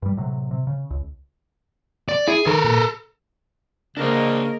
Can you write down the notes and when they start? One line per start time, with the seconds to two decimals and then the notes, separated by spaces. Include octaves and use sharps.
0.02 G2 G3
0.17 A2 C3 F#3
0.51 C3
0.67 C#3
0.90 C#2
2.09 D5
2.28 E4 G#4
2.46 D#3 A4 A#4
2.64 A#2
3.97 C#3 A#3 D4 A#4 C5 D#5